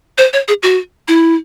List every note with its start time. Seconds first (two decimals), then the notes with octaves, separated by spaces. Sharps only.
0.18 C5
0.33 C#5
0.48 G#4
0.63 F#4
1.08 E4